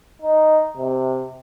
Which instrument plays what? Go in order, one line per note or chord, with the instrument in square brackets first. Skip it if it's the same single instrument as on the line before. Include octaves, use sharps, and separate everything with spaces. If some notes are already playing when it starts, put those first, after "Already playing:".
[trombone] D#4
C3